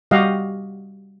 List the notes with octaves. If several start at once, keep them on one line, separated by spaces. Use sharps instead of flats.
G3 F#4 G4 D#5 F5 F#5